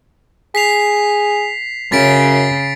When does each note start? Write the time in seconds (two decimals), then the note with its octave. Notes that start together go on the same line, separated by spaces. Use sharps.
0.55 G#4 B6 C7 F7
1.92 F#2 C#3 A6 B6 D7